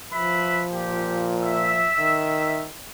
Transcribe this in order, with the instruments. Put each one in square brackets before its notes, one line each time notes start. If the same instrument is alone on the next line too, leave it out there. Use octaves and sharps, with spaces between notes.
[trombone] F3 [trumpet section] B4 E5 B5
[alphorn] A#2 [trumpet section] G4
[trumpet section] E5
[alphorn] D#3